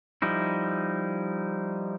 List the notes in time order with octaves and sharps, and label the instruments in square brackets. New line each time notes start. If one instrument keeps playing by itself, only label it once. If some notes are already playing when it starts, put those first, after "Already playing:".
[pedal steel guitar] F3 G3 D#4 E4